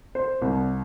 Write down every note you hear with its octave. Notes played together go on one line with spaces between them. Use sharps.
C5
C2